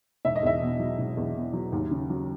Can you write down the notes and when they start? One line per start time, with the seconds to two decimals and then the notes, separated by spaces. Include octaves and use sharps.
0.25 E1 E5
0.36 D#5
0.43 E2 E5
0.62 B2
0.79 F#3
0.99 E1
1.17 E2
1.36 B2
1.53 F#3
1.72 D#2
1.91 C#3
2.10 F#3